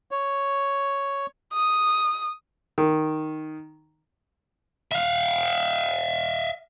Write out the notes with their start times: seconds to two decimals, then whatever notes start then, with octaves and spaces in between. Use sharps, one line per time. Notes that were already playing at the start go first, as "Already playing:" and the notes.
0.11 C#5
1.54 D#6
2.78 D#3
4.92 E5 F5